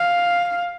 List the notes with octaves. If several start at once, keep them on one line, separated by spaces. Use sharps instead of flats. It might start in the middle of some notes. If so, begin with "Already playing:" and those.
Already playing: F5